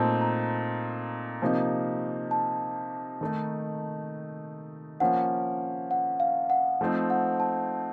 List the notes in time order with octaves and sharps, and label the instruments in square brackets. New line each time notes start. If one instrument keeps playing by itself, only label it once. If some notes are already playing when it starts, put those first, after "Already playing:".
Already playing: [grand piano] A#2 A3 C4 D#4 [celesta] A5
[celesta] A#5
[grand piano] C3 F3 A#3 D#4
[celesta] A5
[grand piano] D#3 A3 D#4
[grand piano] F3 A#3 C#4 [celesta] F#5
[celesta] F#5
F5
F#5
[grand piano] F3 A3 C4 D#4
[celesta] F#5
A5